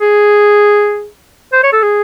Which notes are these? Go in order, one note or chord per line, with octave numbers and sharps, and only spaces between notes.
G#4
C5
C#5
A4
G#4